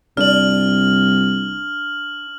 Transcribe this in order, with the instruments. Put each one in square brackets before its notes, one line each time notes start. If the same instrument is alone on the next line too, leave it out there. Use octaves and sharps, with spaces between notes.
[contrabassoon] C2 [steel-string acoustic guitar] D4 [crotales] F6 F#7